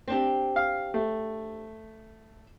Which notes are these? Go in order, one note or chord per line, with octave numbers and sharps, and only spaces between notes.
C4 D4 G4
F5
A3